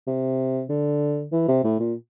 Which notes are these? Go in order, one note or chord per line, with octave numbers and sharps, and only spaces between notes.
C3
D3
E3
C3
A2
A#2